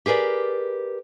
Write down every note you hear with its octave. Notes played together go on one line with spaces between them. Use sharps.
G4 G#4 A#4 B4 D5